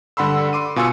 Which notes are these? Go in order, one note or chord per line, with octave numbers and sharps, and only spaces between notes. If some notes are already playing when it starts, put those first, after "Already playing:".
G2 D3 F#5 B5 C6 E6
C6 D6 D#7
B2 F4 G#5 C6 E6 C#7